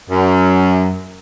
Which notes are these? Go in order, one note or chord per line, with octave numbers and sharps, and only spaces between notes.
F#2